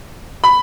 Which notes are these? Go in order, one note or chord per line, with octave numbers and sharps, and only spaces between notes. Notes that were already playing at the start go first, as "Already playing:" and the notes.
B5